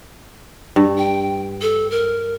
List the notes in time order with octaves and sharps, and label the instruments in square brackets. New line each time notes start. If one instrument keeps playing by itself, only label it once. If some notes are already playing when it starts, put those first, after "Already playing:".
[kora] G2
[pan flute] G5
A4
A#4